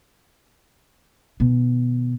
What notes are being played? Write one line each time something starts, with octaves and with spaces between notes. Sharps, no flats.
B2 D#3